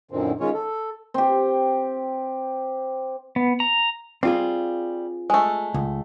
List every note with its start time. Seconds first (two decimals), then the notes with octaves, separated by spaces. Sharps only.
0.11 F#2 A#2 D3 D#3 C4
0.40 D#3 G#3 C#4 F4 C#5
0.54 A4
1.14 C4 G4
3.36 B3
3.60 A#5
4.23 G3 C4 F4 G#4
5.30 G#3 A3
5.74 C#2